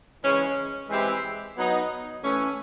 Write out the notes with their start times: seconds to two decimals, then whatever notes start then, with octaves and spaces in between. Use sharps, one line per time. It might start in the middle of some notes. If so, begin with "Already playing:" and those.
0.22 C#3 E3 G#3 C#4
0.89 E3 G#3 C4 E4 G4
1.56 F#3 B3 D#4
2.23 E3 A3 C#4